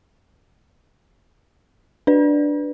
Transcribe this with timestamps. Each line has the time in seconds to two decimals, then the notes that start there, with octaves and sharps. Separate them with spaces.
2.07 D4 B4 D5